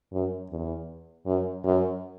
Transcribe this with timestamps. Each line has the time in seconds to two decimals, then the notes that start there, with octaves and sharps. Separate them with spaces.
0.12 F#2
0.50 E2
1.26 F#2
1.64 F#2